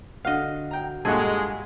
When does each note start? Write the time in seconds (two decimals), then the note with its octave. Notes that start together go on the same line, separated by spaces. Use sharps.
0.25 D3 F#4 D#5 F5 F#5
0.71 G5 A#5
1.05 G2 A#2 G#3 F#4 G#4 A4